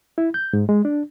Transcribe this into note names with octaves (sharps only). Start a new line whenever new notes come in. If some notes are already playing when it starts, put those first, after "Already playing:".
E4
G6
G#2
G#3
D4